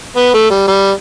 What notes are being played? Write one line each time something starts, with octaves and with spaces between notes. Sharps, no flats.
B3
A3
G3
G3